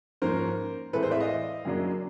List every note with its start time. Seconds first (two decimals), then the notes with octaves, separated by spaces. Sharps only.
0.22 G#2 F3 A#3 C#4 A#4 C5
0.93 A2 E3 G#3 C4 A4 B4
1.02 A#4 C5
1.11 D5 E5
1.20 D#5 F5
1.65 F#2 C#3 F#3 A#3 D4